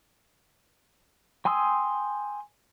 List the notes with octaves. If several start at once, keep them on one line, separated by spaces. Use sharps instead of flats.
G5 G#5 C6 D#6 E6